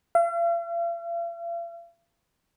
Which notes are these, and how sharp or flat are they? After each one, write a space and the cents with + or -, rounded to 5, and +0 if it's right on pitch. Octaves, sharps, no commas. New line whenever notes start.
F5 -45